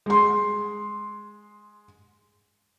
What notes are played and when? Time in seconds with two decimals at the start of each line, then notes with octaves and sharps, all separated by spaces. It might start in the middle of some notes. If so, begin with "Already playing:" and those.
0.06 G#3 C6